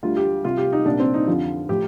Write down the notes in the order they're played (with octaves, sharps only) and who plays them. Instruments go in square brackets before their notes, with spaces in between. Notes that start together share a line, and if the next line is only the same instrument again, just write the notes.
[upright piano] D2 D3 G3 F4
G4
C2 C3 G3 F4
G4
D#4
C2 A#2 G3 D4
C4
D#4
F2 D3 F3 F4
A2 F3 G4